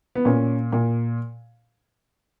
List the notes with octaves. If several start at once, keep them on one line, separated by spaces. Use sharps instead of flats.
B3
A#2 C#4
A#2